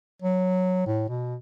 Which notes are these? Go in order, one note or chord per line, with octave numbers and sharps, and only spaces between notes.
F#3
A2
B2